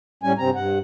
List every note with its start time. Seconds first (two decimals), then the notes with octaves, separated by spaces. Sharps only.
0.23 A2 G3 C#4 G#5
0.38 G2 C3 C4 A#5
0.55 G2 F#5